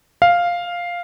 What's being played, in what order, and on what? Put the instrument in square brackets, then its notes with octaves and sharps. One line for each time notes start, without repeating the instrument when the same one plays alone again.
[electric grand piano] F5